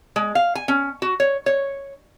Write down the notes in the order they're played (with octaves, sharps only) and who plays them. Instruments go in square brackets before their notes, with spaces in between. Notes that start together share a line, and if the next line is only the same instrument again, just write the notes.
[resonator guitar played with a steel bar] G#3
F5
G#5
C#4
F#4
C#5
C#5